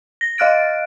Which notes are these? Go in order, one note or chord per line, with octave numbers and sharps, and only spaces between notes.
A#6
D#5 F5 F6 F#6 A6 D7